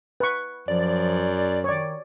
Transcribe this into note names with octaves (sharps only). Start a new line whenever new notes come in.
B4 C#6
F#2 F3 D5
D#3 C#5 D5